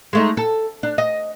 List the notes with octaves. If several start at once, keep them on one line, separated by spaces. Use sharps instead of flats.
G#3 A3 D#4
A4
D4
D#5